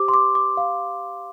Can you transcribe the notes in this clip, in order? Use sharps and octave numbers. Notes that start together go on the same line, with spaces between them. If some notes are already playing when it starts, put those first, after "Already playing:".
Already playing: G4 C5 D6
C6
D6
D6
F5